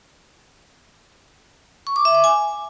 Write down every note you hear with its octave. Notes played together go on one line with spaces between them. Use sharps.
C#6
D6
E5
D6
G#5